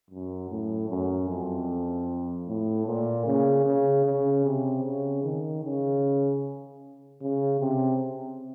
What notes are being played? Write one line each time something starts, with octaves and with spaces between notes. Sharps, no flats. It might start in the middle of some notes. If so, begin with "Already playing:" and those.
F#2
A2
F#2
F2
A2
A#2
C#3
C#3
C#3
C3
C#3
D#3
C#3
C#3
C3